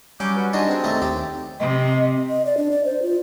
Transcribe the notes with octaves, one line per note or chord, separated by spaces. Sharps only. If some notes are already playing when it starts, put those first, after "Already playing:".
F#3 G3 C#4 D6 G6
F#4 B4
D4 D#4 F#4 G#5 C6
C3 C4 G#4
F#2 A3 D#4
D#2 G4
C3 D#5
D#5
D5
D4
D5
C5
F4